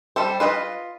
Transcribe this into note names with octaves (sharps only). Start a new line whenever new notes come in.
G3 A4 C5
F4 B4 D#5